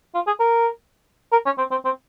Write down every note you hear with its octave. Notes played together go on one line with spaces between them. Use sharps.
F4
G#4
A#4
A#4
C#4
C4
C4
C4